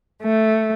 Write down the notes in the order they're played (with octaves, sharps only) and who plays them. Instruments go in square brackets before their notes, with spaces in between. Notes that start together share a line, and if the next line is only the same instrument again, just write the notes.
[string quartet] A3